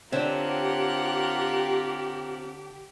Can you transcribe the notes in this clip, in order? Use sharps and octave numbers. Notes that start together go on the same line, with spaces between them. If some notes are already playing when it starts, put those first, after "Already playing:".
D3 C4 F4 G4 A#4 C#5 E5 F#5